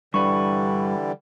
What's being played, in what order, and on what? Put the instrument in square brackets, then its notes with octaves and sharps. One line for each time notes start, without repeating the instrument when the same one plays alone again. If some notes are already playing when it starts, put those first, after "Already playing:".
[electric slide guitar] G2 B4 [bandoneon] D3 E3 G3 [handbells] C#6